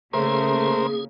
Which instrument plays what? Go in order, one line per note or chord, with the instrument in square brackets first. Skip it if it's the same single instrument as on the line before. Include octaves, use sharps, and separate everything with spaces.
[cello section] C#3 A#3 [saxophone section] A3 [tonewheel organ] G#4 [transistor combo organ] A#4 C5